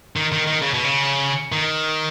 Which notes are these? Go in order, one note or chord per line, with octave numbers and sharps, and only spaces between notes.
D#3
D#3
D#3
C#3
B2
C#3
D#3